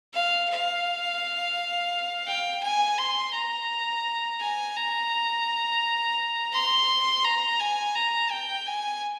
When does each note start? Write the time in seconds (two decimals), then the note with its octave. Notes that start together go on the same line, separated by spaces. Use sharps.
0.14 F5
0.49 F5
2.27 G5
2.63 G#5
2.98 C6
3.34 A#5
4.40 G#5
4.76 A#5
6.53 C6
7.24 A#5
7.60 G#5
7.95 A#5
8.31 G5
8.66 G#5